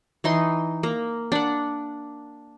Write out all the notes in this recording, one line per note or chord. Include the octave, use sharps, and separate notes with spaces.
E3 D#4 C6
A#3
D4 F#5